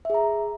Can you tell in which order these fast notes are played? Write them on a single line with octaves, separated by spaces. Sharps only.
E5 G#4 A#5